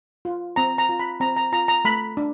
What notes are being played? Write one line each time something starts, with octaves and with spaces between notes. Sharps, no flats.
F4
C4 A#5
A#5
F4
B5
C4 A#5
A#5
F4 A#5
A#5
A3 B5
D4